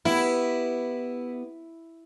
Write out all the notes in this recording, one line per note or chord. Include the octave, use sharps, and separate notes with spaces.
B3 E4 G4